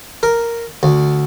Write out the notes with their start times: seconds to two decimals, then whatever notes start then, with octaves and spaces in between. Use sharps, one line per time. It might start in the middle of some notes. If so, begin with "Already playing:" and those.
0.23 A#4
0.83 D2